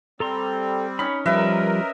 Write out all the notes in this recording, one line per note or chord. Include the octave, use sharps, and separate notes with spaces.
G3 C4 A4 A#5 C6
C#4 D#4 B5
F3 G3 A#4 B4 D#5 E5